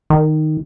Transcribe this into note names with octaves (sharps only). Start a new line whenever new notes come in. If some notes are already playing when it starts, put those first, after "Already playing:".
D#3